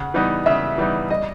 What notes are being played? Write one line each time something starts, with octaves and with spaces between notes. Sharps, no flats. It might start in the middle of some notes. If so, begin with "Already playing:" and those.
Already playing: C#3 F#5
E3 G3 B3 D#4
C#3 E5
E3 G3 B3 D#4
G3 D#5